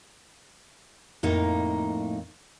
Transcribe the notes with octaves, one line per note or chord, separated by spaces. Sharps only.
F2 A2 A#3 D#4